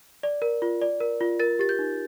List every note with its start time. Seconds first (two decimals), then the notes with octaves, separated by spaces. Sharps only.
0.23 D5
0.42 A#4
0.62 F4
0.82 D5
1.00 A#4
1.21 F4
1.40 A#4 A6
1.59 G4 A6
1.69 G6
1.79 D#4